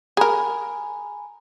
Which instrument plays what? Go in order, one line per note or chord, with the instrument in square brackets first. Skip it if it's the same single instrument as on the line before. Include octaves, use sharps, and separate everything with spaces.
[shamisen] G#4 A#4 [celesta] G#5 A#5 B5